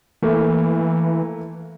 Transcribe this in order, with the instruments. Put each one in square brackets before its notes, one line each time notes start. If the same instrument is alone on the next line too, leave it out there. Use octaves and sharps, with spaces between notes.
[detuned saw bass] E3 [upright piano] A3 A#3